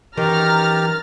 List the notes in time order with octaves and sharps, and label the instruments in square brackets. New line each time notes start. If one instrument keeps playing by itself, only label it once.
[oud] F#2 D#3 [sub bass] E3 [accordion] G4 [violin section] A#5 F6 A6